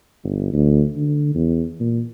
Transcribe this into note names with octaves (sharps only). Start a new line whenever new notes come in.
G1
D2
D3
E2
A#2